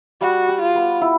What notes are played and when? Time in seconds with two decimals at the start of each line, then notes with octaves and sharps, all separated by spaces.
0.21 G3 F#4
0.48 G4
0.62 F4
0.76 B3
1.01 E4